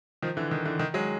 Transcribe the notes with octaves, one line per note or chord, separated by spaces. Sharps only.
D#3 F3
D3 E3
D#3
D3 E3
D#3
F#3 G#3